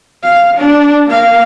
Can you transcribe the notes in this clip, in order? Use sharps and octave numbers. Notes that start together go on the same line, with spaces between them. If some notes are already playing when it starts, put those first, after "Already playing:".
F5
D4
A#3 F5